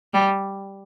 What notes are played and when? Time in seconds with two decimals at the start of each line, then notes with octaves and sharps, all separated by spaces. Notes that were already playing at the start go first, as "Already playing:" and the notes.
0.13 G3